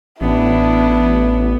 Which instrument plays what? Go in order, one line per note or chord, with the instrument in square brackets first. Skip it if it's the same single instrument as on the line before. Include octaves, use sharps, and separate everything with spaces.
[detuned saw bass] A1 [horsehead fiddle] B3 [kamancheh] D4 E4